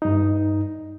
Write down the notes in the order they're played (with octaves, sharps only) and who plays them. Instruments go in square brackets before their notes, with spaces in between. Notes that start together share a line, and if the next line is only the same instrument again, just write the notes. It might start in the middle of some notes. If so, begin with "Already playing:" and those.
[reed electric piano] G2 D#4